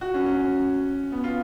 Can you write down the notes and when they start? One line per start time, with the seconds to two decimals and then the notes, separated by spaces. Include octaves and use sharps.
0.01 F#4
0.14 C#4
0.26 C#4
1.12 B3
1.24 F4